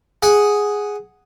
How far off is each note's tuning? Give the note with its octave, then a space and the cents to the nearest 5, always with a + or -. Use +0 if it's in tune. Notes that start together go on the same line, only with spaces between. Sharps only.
G#4 +0 F#5 +0